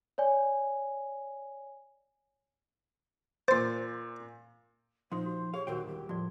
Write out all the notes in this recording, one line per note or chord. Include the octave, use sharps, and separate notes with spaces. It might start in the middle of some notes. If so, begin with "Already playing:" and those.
C#5 D5 G#5
A#2 C5 C6 A6
A#2 F3 D#4 C5 C6
F#4
G4 G#4 C#5 F5
D#1 B1 D4 F#4 A#4 C5 G5 E6
D#1 G4
A2 F3 F#4 D5